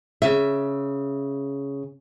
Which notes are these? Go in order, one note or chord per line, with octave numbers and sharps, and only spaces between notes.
C#3 E5